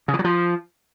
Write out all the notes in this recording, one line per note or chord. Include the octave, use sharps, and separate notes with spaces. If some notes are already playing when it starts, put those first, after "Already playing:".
C#3
E3
F#3
F3